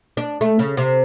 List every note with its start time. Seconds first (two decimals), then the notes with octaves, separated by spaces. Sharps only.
0.17 D4
0.41 A3
0.59 C#3
0.77 C3